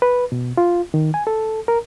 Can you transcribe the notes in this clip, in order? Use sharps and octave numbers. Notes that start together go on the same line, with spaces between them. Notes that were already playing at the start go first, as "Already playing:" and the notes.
B4
B2
F4
D#3
G#5
A4
A#4